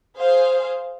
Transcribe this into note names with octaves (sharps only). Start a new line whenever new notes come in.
G#4 C5 F5